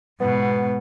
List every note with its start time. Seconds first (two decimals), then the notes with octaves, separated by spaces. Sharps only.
0.21 G#2 B2 B3